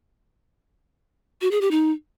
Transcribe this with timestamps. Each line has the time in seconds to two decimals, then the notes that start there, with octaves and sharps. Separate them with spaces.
1.41 F#4
1.51 G#4
1.61 G4
1.71 D#4